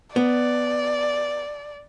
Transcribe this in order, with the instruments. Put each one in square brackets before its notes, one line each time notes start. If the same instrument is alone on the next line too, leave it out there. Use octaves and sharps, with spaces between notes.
[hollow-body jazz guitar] B3 [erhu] D5